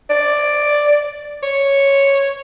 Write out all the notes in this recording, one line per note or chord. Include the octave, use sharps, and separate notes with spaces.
D5
C#5